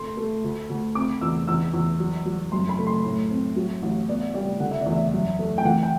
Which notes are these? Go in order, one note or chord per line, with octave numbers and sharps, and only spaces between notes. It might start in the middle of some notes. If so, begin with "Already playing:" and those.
Already playing: A3 C6
A3
D2
D2
C4 D6
E2 E6
E2 E6
E2
F#3
F#3
F#2 C6
B5
A3
C6
A2
C4
F#3
A1
B3 D5
G3 D5
D3 F#5
E5
E2 D5
E5
F#2
A3
G5
E3 F#5
G5